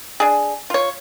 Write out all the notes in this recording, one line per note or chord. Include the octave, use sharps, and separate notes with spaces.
D4 G#4
F4 C#5